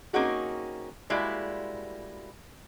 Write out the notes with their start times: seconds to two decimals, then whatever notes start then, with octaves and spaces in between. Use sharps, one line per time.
0.13 A#3 C4 C#4 D#4 F#4 G#4
1.10 G3 G#3 A#3 E4 F#4 D5